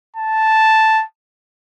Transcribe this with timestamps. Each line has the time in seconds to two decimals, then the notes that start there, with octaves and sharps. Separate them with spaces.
0.16 A5